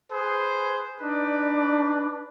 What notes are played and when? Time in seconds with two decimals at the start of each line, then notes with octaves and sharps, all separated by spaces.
0.10 G#4 B4 C5
1.01 D4 D#4 B4 D5